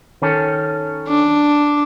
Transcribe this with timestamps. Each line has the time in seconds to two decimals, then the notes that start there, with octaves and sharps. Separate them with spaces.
0.22 D#3 C#4 A4
1.08 D4